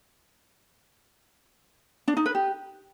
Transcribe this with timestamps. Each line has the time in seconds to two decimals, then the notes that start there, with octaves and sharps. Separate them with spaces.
2.08 D4
2.17 D#4
2.26 B4
2.35 G4